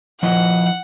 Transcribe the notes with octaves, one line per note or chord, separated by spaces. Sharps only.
F3 E4 D#5 F#5